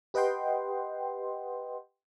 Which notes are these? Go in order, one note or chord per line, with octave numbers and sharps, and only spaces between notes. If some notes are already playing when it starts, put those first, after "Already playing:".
G4 B4 D#5 F#5 G5 C6